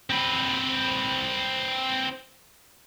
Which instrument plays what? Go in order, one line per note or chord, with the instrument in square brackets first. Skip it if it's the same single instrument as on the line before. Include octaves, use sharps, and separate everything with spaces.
[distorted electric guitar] C4 B4